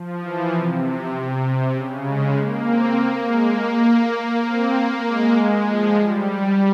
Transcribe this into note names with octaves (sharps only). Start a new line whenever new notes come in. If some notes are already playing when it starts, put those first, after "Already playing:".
Already playing: F3
E3
C3
C3
C3
C#3
G#3
A#3
C4
A#3
G#3
A#3
A#3
A#3
C4
A#3
G#3
F3
G3